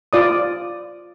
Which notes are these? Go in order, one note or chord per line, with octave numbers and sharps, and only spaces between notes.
F4 D5 D#6